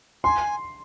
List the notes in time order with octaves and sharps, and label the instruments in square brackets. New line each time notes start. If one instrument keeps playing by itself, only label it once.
[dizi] G#5 [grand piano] C6